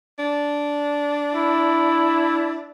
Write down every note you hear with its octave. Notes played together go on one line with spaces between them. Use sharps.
D4
E4